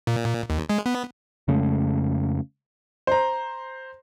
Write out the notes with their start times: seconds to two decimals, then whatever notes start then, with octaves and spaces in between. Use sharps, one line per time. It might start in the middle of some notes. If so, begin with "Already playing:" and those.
0.07 A#2
0.50 D#2
0.69 G#3
0.86 B3
1.48 F2 C#3 G#3 A3
3.07 C5 A#5